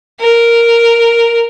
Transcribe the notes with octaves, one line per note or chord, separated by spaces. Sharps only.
A#4